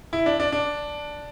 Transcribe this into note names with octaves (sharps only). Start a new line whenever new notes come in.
E4
D4
D4
D4